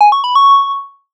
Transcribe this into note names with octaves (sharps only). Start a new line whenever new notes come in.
G#5
C#6
B5
C#6